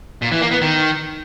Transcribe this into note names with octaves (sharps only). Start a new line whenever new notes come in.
A#2
E3
A#3
B3
D#3